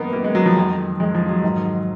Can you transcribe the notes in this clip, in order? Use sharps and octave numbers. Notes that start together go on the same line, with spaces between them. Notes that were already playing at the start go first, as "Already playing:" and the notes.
Already playing: F#2 D#3 A#3 B3 D#4
F#2 D#3 A#3
G#3
F#3
F3
F2 D#3
F2 D#3 G#3
F3
F#3
G#2 D#3